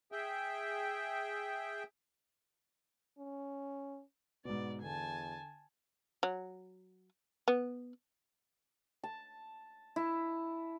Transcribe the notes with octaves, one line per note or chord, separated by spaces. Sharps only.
G#4 E5 G5
C#4
G#2 B2 B3 D5
E2 D3 G#5 A5
F#3
B3
A5
E4